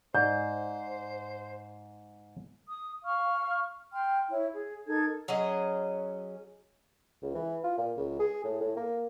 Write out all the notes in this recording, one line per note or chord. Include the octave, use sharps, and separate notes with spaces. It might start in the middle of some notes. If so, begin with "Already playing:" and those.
G#2 C5 D5
D#6
F5 C#6 F6
G5 C6 F6
E4 C#5
G#4
D#4 A4 A#4 G#6
F#3 C#4 G#4 D#5
C#2
E3
F4
A#2
C#2
G#4
A2
A2
A#3